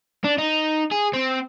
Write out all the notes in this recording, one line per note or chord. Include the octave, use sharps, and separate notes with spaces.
D4
D#4
G#4
C4